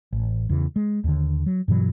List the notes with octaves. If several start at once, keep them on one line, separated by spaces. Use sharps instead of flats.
A1
E2 C#3 E3
G#3
D#2 D3
F#3
G2 B2 E3 F#3